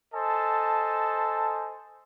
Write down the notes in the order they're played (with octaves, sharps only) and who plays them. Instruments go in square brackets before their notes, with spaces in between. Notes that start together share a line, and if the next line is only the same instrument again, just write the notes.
[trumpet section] A4 C5 D#5 G#5 A5